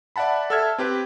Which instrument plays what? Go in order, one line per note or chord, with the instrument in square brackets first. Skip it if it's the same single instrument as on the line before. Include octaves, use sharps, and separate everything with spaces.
[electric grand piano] D5 E5 F#5 A5 B5
A4 E5 A5 E6 F6 G#6
C4 G4 B4